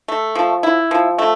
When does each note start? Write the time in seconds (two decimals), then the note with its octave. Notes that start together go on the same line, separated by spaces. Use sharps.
0.08 A3
0.35 F3
0.63 E4
0.91 F3
1.18 A3